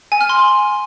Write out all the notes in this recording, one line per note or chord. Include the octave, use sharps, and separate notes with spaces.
G#5
F6
C6